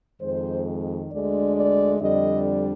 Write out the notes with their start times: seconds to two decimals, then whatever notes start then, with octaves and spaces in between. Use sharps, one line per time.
0.21 F2 D#3 G#3 C5
1.11 D2 D3 G#3 D4 D5
1.55 D5
2.01 F2 D3 G3 D4 D#5